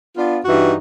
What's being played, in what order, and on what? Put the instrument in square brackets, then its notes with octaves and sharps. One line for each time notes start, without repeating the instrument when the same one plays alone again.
[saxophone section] B3 D4 F4
G2 E3 D#4 F#4